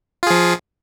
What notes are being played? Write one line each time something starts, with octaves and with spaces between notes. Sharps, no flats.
F3 F4 G#4